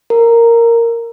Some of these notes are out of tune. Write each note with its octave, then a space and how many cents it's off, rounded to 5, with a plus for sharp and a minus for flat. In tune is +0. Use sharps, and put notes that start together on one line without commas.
A#4 -5